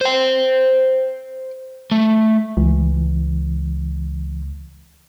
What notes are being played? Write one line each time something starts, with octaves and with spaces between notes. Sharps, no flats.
C5 G5
A3
C#2 E3